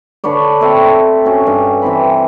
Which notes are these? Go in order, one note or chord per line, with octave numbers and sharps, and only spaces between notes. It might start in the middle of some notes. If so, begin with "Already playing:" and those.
D3 B4 C#5 D5
C4 A4 C#5 E5
C#4 F#4
G2
E3 C4 B5